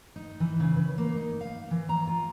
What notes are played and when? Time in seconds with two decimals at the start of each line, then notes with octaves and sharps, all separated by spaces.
0.16 D#4
0.40 E3
0.60 C#3
0.76 B4
0.98 A#3
1.17 D#4
1.41 F5
1.71 E3
1.89 A#5
2.07 F4